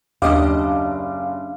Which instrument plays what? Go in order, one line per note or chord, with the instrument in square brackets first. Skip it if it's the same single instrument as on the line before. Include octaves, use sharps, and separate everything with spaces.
[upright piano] F#1 D6 [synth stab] D#2 D#5 [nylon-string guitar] D4 G4 [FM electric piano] F5